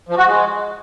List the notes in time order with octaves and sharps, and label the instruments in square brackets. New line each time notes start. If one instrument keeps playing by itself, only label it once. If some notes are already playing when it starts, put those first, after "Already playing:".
[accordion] F3
F#4
G#3